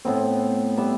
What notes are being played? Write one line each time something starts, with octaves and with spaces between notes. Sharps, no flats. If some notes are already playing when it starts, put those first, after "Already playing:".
A2 B3 C4
G3 B3 E5